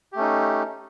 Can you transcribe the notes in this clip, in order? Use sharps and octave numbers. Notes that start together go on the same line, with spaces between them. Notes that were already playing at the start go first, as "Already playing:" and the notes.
A3 C#4 D#4 G4